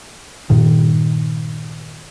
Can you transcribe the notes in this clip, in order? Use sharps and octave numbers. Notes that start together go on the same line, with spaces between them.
G2 A#2 D#3